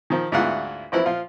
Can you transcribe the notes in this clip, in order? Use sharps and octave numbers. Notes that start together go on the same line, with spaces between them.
D#3 F3
D2 G#2 B3 E4 F4 F#5
A1 F3 C4 E4 B4
F3 F4